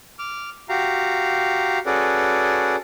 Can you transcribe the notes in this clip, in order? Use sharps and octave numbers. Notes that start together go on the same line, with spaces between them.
D6 F6
F#4 G4 F5 A#5
C#4 F#4 G#4 A4 B4 D5